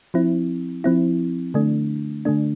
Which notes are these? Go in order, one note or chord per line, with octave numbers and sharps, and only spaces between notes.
F3 C4 E4
F3 C4 E4
D3 A3 D4
D3 A3 D4